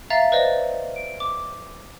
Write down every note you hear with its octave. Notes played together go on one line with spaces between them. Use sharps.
E5 F5 A#5 A6
B4 C5 D5 D#5
D7
D6